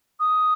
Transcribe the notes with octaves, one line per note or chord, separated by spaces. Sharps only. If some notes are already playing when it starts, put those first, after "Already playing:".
D#6